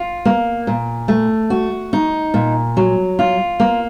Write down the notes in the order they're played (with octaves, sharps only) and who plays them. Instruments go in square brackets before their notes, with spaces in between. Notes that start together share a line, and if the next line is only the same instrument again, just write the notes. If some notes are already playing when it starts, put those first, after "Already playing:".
Already playing: [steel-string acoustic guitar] F4
A#3
A#2
A3
F#4
D#4
A#2
F#3
F4
A#3